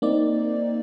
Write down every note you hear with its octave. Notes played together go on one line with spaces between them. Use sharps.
A#3 C4 D#4 D5